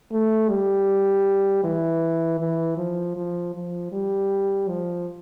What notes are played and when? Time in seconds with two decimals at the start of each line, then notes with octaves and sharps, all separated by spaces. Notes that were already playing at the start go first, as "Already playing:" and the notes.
0.11 A3
0.49 G3
1.64 E3
2.40 E3
2.78 F3
3.16 F3
3.54 F3
3.92 G3
4.68 F3